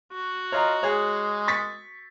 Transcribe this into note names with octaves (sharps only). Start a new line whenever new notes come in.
F#4
F4 C#5 D#5 A#5
G#3 G#4 C#5
C#6 A6 B6